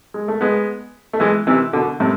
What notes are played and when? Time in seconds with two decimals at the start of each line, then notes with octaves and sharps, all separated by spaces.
0.14 G#3
0.28 A3
0.41 G#3 B3
1.13 A3
1.20 E3 G#3
1.47 C3 E3
1.73 B2 D3
2.00 A2 C3